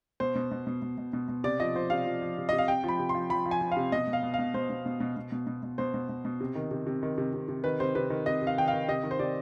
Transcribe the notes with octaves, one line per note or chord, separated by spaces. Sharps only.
B2 C5
B2
B2
B2
B2
B2
B2
B2
C3 D5
F3 D#5
F3 C5
C3 F5
F3
F3
C3
C3 D#5
F5
C3 G5
F3 B5
C3
C6
F3
F3 B5
F3
G#5
F3
F5
C3
B2 D#5
B2
F5
B2
B2 F5
B2 C5
B2
B2
B2
B2
B2
B2
B2
B2 C5
B2
B2
B2
C3
D#3
C3
C3
D#3
C3
C3
C3
D#3 B4
C3 C5
C3 B4
D#3
C3 D#5
C3
F5
D#3 G5
F5
D#3
C3 D#5
D#3
C5
C3 D5